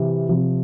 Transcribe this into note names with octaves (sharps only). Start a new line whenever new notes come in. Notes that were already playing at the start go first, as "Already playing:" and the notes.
Already playing: C3 E3
C3 F3